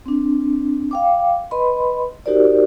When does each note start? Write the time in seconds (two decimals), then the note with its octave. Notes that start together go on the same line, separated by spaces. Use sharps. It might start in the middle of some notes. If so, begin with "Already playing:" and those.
0.06 C4 D4
0.91 F5 G5 D6
1.51 B4 D#5 B5 C6
2.26 D#4 F#4 G4 A#4 C5 D5